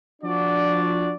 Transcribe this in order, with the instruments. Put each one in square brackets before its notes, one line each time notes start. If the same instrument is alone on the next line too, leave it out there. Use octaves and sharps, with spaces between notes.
[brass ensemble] F3 D4 F#4 D5